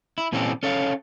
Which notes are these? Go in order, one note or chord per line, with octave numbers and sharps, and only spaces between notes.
E4
A#2 E3 C4 C#4 G4 A4
C#4 A4 C#5 F5